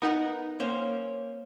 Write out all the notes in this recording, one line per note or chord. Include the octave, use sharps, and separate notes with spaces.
B3 D#4 A#4 F#5
A#3 C#4 C5